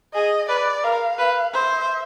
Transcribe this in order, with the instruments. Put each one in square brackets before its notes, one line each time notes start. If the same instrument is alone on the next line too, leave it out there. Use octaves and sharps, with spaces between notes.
[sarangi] G#4 [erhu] D#5
[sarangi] B4 [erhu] D5
[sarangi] A#4 [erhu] F5
[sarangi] B4
[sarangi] C5 [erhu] E5